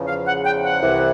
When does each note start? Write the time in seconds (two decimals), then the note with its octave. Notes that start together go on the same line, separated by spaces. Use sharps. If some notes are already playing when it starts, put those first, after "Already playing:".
Already playing: E2 C#3 F3
0.08 F5
0.26 F#5
0.45 G5
0.64 F#5
0.82 C2 C3 E3